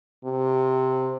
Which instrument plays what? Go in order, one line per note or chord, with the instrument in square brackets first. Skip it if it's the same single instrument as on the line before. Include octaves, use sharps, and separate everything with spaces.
[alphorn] C3